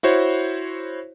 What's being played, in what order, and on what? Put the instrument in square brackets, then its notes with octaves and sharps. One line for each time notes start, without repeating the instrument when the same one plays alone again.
[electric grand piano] E4 F#4 C5 C#5